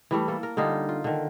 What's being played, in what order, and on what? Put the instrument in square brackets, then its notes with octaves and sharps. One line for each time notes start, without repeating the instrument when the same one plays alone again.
[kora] E3 G3 A3
A#3 A4
A#4
D3 G3 D#4 F4
F4
D3 D#3